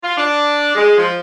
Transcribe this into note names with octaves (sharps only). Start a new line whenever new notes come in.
F4
D4
G#3
F3